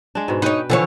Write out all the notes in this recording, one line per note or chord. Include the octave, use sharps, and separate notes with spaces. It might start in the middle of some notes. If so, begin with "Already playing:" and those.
G#3 D4
G#2 B2
D#4 B4 C#5 G5
D3 E3 F3 C#5